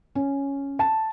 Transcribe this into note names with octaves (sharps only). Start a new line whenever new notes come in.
C#4
A5